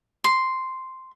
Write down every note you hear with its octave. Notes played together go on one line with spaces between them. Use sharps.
C6